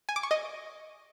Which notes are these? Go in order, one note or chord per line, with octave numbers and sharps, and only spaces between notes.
G#5
D6
C#6
D#5